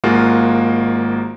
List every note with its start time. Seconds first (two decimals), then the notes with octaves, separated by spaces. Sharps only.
0.04 G#1 G#3 A#3 F4 F#4